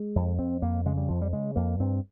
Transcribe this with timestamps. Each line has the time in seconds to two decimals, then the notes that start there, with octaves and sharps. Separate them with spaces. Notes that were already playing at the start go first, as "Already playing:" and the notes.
Already playing: G#3
0.16 F2
0.39 F2 C4
0.62 F2 A#3
0.85 C#3 G#3
0.97 G3
1.09 F2 F3
1.22 G3
1.33 C#3 G#3
1.56 F2 A#3
1.80 G2 C4